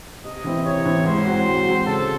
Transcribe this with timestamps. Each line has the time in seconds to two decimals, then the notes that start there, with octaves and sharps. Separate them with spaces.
0.24 C3 D#5
0.44 E3 C4 E4
0.65 C3 C#5
0.85 E3 C4 E4
1.06 G#2 C5
1.25 F#3 C4 F#4
1.46 G#2
1.66 F#3 C4 F#4
1.86 C#3 A4